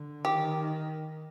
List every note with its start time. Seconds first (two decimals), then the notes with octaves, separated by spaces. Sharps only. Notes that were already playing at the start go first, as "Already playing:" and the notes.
Already playing: D3
0.25 D#3 G4